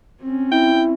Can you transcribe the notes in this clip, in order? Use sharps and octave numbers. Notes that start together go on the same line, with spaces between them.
C4 C#4
E4 G5